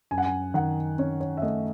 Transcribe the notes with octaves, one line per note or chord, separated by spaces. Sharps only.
F#2 G#5
F#5
G#5
D#3 F#5
C#4 C#5
C#5
E5
A3 D#5